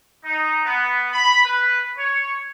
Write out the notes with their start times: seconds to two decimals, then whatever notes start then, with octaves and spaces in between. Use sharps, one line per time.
0.24 D#4
0.64 B3
1.12 B5
1.45 B4
1.97 C#5